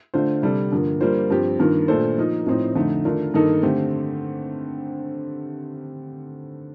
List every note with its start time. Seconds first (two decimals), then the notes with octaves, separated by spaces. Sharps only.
0.14 D3 A3 D4 F4 C5
0.42 C3 G3 D4 A4
0.72 G2 D3 F3 A#3
1.01 G3 A#3 D4 F4 C5
1.30 G2 F3 C4 G4
1.59 G2 D#3 A#3 F4
1.88 A#2 A3 D4 A4 C5
2.18 F3 A#3 D#4 A#4
2.47 A2 F3 C4 D#4
2.75 F2 D3 A3 D#4
3.05 D#3 A3 D4 F4 A#4
3.34 G2 D#3 A#3 D#4 A4
3.63 D3 A3 C4 G4